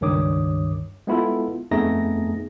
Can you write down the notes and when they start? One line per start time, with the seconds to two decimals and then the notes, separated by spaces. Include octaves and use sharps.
0.01 C#2 G2 D#3 C#5 D6 D#6
1.07 G#3 B3 E4 F4 A4
1.71 F2 A3 B3 D#4 G#4 A#6